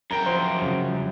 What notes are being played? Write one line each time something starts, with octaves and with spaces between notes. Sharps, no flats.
F#2 A#4 G5 A#5
F3 C5 A#5
C#3
G3